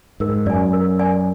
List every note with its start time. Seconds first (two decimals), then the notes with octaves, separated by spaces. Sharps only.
0.20 G#2 A#4
0.46 F#2 D5 G#5
0.73 A#4
0.99 D5 G#5